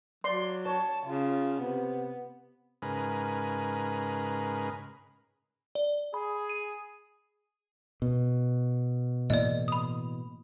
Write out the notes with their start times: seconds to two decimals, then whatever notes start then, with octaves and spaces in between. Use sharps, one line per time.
0.24 F#3 D5 C6
0.66 C#5 A5
1.06 C#3 F4
1.60 C3 B3
2.82 G#2 C#3 G#4 A#4 B4
5.75 D5
6.14 G#4 B5
6.49 D#7
8.02 B2
9.30 A2 E3 A#3 D5 D#5
9.68 B5 D#6